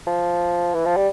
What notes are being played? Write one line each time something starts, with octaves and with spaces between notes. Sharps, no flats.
F3
E3
F3
G3